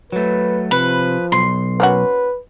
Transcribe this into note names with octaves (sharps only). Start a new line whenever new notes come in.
F#3 A3 B4
C3 F3 B4
B1 C6
A#3 C#4 F#4 B4